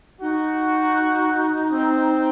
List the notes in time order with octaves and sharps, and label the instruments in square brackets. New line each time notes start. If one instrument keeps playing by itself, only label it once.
[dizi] D#4 [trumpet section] F#4
[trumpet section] C4